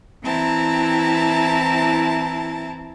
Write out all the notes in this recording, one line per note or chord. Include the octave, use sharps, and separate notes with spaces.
E3 C4 E4 A5 A#5